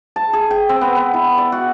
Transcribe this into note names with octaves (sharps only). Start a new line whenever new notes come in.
A5
G#4
G5
C4
B3
B3
E4
D5
F#4